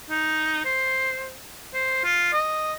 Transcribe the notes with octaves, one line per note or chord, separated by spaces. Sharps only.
D#4
C5
C5
F4
D#5